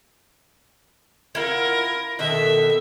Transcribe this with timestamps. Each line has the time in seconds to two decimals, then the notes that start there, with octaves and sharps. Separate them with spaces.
1.35 E4 F4 A#4 F#5
2.19 B2 D#3 A4 E5